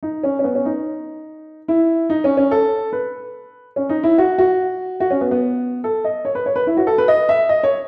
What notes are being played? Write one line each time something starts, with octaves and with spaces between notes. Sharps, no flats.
D#4
C#4
C#4
B3
C#4
D#4
E4
D#4
C#4
C#4
A4
B4
C#4
D#4
E4
F#4
F#4
F#4
C#4
B3
B3
A4
D#5
C#5
B4
C#5
B4
E4
F#4
A4
B4
D#5
E5
D#5
C#5